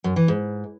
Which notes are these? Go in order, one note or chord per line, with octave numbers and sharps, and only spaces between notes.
F#2
E3
G#2